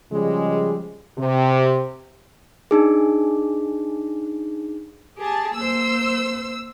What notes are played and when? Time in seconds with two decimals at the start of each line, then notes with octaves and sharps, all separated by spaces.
0.12 C#3 F3 G3 G#3
1.18 C3
2.71 D4 D#4 G#4
5.18 G4 G#4 A5
5.55 A#3 C5 E6